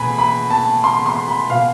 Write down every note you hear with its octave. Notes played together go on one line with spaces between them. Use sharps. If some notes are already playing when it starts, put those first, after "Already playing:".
Already playing: B2 G#5 B5
B5
A5
C6
C6
B5
B2 F5